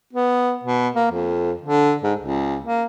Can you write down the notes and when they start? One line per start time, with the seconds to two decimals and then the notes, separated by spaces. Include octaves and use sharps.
0.13 B3
0.64 B2
0.95 A#3
1.12 F2
1.62 D3
2.04 G#2
2.19 C#2
2.64 A#3